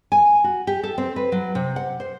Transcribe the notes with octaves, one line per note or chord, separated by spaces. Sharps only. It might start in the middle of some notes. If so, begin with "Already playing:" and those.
G#5
F#4
G4
A4
C4
B4
F#3
C3
F#5
C5